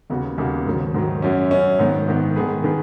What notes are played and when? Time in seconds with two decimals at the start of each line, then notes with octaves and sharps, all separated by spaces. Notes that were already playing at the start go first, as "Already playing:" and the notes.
0.10 D#2 C#3 B3 F#4
0.38 D#2 C#3 B3 F#4
0.66 G#2 D#3 F#3
0.94 G#2 D#3 F#3
1.22 F#2 F#3 C#4
1.51 F#2 F#3 C#4
1.79 G#2 D#3 B3
2.08 G#2 D#3 B3
2.36 D#3 B3 G#4 B4
2.64 D#3 B3 G#4 B4